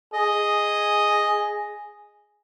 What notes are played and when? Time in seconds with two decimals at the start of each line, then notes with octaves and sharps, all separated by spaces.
0.14 G#4 D#5